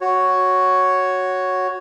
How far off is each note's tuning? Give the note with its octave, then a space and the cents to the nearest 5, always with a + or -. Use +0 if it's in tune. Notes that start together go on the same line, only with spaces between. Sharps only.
F#4 +0 C#5 +0